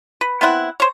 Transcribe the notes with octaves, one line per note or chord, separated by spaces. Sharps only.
B4
B3 C4 E4 F#5
C5 C#5